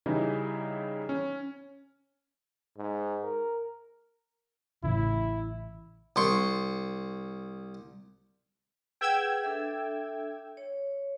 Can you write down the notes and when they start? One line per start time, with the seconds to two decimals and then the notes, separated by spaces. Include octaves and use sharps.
0.06 C#3 E3 G3 D#4 E4
1.09 C#4
2.77 G#2
3.23 A#4
4.84 A1 C#3 E4
6.16 C2 C6 C#6
9.01 G#4 B4 F#5 G5 E6 G#6
9.43 D4 A4 E5
10.57 C#5